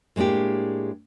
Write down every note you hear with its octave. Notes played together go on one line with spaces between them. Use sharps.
A2 G#3 A#3 D4 G4